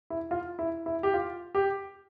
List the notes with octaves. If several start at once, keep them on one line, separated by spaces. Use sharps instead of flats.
E4
F4
E4
E4
G4
F4
G4